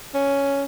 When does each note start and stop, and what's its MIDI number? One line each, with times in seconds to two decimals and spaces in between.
0.15 0.65 61